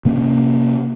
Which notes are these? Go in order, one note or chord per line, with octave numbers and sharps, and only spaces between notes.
C3 A#3 C#4